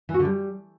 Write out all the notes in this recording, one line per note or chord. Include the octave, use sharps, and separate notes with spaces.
E3
F#4
D3
G3